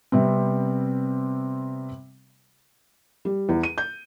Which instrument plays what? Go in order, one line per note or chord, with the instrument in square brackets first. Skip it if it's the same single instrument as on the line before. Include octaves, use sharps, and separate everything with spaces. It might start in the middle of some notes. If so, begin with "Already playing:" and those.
[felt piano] C3 G3 B3 C4
G3
E2
D#7
G6